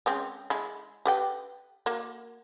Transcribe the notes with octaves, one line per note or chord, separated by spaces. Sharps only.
G#3 C4 C#4
G#3 E4
G4 B4 G5
A#3 F#4